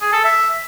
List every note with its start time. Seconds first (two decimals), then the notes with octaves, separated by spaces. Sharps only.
0.01 G#4
0.13 A4
0.24 E5